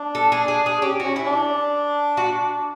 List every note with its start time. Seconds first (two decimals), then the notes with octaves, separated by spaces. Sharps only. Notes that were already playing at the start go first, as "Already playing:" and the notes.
Already playing: D4
0.15 A4
0.32 G#4
0.48 G#4
0.66 G#4
0.82 C#4 G4
1.00 C#4 F#4
1.16 E4
1.27 D4
2.17 F#4